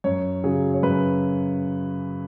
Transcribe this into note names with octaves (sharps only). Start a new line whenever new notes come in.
F#2 C#5
C#3 F#3 G#4
C#5
F#2 B4